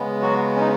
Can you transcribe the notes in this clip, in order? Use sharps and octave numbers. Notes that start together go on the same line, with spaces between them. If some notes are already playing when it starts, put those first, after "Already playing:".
Already playing: C#3 G#3 B3
F#3 F#4
C#4
D#4